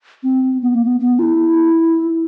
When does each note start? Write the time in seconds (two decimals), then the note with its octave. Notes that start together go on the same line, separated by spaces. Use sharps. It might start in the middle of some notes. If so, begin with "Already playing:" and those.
0.23 C4
0.62 B3
0.75 A#3
0.87 B3
1.00 B3
1.19 F4
1.22 E4